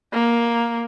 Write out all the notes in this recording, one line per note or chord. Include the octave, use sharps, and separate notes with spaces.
A#3